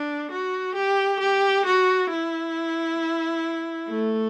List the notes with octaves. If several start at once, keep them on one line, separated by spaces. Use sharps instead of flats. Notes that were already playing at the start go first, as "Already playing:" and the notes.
Already playing: D4
F#4
G4
G4
F#4
E4
A3